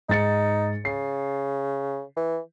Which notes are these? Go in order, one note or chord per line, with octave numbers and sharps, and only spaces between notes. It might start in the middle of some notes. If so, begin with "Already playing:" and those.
G#2 D#4 A6 C#7
C#3 C7
E3